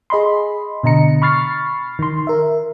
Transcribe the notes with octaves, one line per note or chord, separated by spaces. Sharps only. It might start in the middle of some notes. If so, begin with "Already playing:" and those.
G#4 D#5 B5 C6
B2 D3 D#5 A#5 C#7
B5 C#6 F6 A6 C7
D#3 C6
A#4 E5